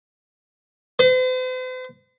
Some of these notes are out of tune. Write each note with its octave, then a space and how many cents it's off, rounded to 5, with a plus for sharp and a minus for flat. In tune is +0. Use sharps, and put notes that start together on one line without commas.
C5 -45